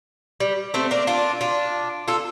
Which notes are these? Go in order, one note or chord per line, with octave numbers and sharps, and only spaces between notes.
G3
A3 C4
A#3 D4
D4 F4
D4 F4
F4 A4